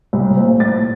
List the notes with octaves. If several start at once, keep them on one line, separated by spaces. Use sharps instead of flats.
C2
A#2 A3 C4
A2 A6